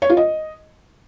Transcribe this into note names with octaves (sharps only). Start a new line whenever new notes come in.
C#5
F4
D#5